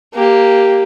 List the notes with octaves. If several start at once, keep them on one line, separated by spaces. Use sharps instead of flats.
A#3 G4